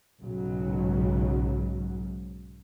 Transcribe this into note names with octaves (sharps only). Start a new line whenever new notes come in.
B1 G#2 C#3 F#3